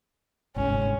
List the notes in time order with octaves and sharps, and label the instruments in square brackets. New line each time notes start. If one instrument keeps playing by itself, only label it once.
[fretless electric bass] G1 C2 G#2 [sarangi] C#4